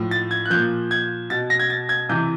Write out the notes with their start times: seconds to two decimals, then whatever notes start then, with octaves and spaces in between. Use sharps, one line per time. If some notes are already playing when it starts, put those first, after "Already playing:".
Already playing: A2 F3
0.11 A6
0.31 G#6
0.46 F#6
0.50 A#2 F3 G6
0.91 G#6
1.30 B2 A6
1.50 A#6
1.59 G#6
1.70 A6
1.89 G#6
2.09 C3 E3 G6